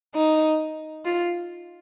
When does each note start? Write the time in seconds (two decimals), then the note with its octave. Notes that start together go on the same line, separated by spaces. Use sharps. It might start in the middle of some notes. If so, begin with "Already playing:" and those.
0.15 D#4
1.05 F4